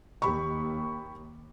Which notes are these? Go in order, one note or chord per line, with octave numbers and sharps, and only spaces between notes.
D#2 G4 B5 C#6